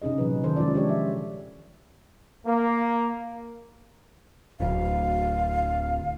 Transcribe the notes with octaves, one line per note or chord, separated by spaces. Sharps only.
C3 C#4 D#4 G#4 D#5
A#2 E3 F#3 B4
D#3 A4 C5
F3 G#3 C#4 F4 D5
D4 G4 C#5
E5
A#3
D1 D2 F5